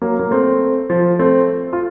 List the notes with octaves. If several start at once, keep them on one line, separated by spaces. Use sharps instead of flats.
F#3 A#3
A#3
A3 C4
F3
A3 C4
F4